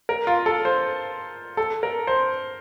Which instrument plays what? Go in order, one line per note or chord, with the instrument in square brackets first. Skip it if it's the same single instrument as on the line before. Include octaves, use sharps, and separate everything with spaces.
[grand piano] A#4
F4
A4
C5
A4
A#4
C5